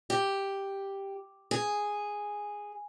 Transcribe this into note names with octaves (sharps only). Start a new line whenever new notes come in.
G4
G#4